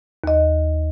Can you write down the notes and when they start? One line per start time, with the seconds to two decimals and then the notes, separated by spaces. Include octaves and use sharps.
0.24 D#2 D#5